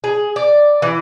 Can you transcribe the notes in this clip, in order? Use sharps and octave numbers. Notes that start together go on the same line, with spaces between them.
G#4
D5
E3